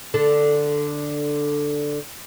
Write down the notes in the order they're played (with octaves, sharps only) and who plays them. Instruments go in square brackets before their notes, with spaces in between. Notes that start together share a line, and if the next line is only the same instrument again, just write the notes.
[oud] D3 D4 A4